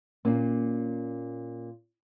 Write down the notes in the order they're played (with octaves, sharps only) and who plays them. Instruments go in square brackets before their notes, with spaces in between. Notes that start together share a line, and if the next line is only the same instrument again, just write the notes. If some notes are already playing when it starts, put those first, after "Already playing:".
[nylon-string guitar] A#2 A#3 C#4